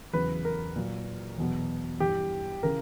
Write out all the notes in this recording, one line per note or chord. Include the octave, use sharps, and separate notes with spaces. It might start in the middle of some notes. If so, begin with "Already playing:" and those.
E2 C#3 F#3 B4
A#4
A#2 F#3
E2 B2 F#3
G2 E3 G4
C#3 E3 A#4